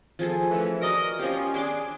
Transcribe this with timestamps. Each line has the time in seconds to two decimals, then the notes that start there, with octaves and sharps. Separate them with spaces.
0.19 F3 G#4 A4
0.49 E3 A3 C#4
0.82 F#4 A#4 D5 D#5
1.19 F3 C#4 G4
1.54 D4 G#4 G#5 C6 D6